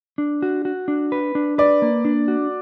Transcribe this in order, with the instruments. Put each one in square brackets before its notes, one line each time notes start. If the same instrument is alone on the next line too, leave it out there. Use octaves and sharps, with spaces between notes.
[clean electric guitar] D4
F#4
F#4
D4
B4
D4
[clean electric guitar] B4 [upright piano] D5
[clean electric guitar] A#3
D4
F#4